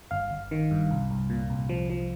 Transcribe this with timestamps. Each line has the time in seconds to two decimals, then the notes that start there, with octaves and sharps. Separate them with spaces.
0.11 G1 F5
0.31 G1
0.51 D#3
0.71 G2
0.91 C2
1.11 C2
1.30 A#2
1.50 C2
1.69 F3
1.90 F3